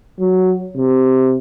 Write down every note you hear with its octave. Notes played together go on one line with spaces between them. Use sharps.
F#3
C3